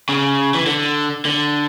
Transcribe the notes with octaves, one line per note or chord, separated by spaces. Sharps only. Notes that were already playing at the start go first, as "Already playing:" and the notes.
C#3
E3
D3
D3